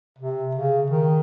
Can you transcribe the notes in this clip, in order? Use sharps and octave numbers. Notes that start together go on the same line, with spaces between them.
C3
C#3
D#3